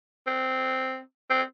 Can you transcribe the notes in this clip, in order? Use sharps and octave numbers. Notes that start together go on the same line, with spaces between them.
C4
C4